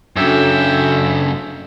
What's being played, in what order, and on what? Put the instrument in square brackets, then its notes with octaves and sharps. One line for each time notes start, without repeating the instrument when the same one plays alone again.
[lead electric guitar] F#2 C#3 [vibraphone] D4 F#4 A4 [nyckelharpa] E5 G5